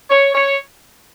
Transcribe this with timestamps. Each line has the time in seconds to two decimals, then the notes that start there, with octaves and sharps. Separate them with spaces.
0.10 C#5
0.35 C#5